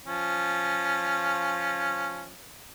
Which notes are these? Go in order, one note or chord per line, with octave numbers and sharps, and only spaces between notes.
F3 C#4